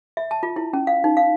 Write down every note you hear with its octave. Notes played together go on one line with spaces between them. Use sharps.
E5
A5
F4
E4
C#4
F5
D#4
F5